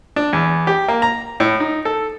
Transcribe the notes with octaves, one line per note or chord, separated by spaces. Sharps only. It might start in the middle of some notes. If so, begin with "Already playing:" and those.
D4
E2
G4
A#3
A#5
A2
D#4
A4